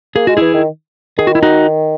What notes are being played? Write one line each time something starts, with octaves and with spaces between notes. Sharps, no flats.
A#3 G#4
G#3 F#4
E3 E4 G#4
D#3
D#3 G#4
F#4
E4
D#4 F#4